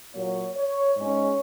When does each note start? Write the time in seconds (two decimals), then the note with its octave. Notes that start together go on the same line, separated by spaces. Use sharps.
0.14 A#2 F#3 A#3 C#5
0.56 C#5
0.97 G#2 G#3 C#4 C#5